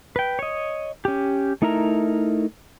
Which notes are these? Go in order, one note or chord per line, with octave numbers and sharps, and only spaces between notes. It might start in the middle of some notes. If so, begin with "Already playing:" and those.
B4 G5
C#5 D#5
C#4 G4
A3 D#4 E4 A#4 A#5